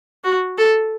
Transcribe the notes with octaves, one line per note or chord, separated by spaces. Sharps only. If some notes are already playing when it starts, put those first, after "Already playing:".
F#4
A4